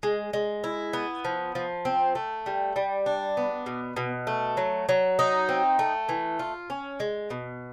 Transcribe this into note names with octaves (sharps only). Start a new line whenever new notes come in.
G#3
G#3
E4
B3
F3
F3
C4
A3
G3
G3
D4
B3
B2
B2
A3
F#3
F#3
D#4
C4
A3
E3
F4
C#4
G#3
B2